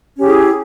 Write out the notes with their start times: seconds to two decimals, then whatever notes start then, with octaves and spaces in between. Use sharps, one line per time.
0.16 C#4
0.20 G4
0.23 G#4
0.27 E4